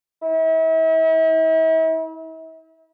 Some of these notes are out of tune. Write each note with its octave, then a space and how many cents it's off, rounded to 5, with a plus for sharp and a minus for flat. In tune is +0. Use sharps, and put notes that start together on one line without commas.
E4 -40